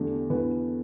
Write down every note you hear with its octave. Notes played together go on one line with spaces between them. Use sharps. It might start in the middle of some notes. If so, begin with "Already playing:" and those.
Already playing: E2 D3 A3 G4
E2 B4